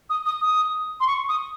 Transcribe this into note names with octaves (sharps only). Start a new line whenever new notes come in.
D#6
D#6
D#6
C6
C#6
D#6